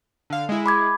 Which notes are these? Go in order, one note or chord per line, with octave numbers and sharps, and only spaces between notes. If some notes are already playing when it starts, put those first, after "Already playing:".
D3 F5
G#3 E4
B5 D6 G#6